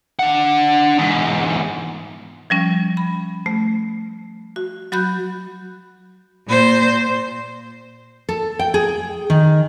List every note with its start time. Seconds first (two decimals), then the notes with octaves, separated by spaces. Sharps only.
0.19 D4 F#5
0.99 E2 G#2
2.50 F3 G3 C#4
2.97 B5
3.46 A3
4.56 F#4
4.92 F#3 F#4 B5 F#6 G6
6.48 A#2 C5
8.29 A4
8.59 G5
8.74 G#4
9.30 D#3